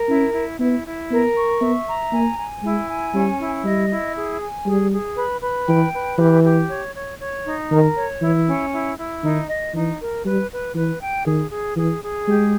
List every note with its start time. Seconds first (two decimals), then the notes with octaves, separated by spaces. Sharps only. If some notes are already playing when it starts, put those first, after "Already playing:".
Already playing: A#4
0.08 C#4 E4
0.34 E4
0.59 B3 E4
0.86 E4
1.10 B3 A#4
1.36 C#6
1.61 B3 E5
1.87 A#5
2.12 A#3 G#5
2.38 G#5
2.62 G#3 E4
2.88 G#5
3.14 G3 C#4
3.40 E4
3.64 G3 D#5
3.90 E4
4.15 G#4
4.41 G#5
4.66 G3 G#4
4.91 G#4
5.17 B4
5.42 B4
5.67 E3 G5
5.92 B4
6.18 E3 G4
6.44 G4
6.69 C#5
6.95 C#5
7.20 C#5
7.45 D#4
7.71 D#3 A#4
7.96 C#5
8.21 E3 E4
8.47 C#4
8.72 E4
8.97 E4
9.23 D#3 D#4
9.49 D#5
9.74 E3 D#4
9.99 A#4
10.25 G3 B4
10.50 B4
10.75 E3 B4
11.00 G5
11.27 D#3 G#4
11.51 G#4
11.76 E3 G#4
12.02 G#4
12.27 G#3 G4